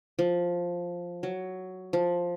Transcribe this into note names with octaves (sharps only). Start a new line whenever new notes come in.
F3
F#3
F3